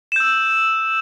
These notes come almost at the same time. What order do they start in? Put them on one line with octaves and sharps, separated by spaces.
E7 G6 E6